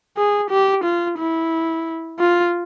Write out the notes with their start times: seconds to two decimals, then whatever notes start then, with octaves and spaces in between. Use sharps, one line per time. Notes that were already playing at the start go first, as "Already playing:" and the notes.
0.17 G#4
0.50 G4
0.84 F4
1.18 E4
2.20 F4